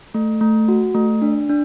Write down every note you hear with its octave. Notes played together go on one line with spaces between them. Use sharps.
A3
A3
F#4
A3
D4
D4